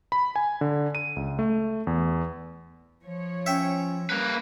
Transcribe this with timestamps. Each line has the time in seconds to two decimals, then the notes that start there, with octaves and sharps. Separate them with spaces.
0.12 B5
0.36 G#5
0.61 D3
0.95 D#7
1.16 C#2
1.39 A3
1.87 E2
3.04 F3 C#5
3.46 C#4 E5 G5
4.10 G3 A#3 B4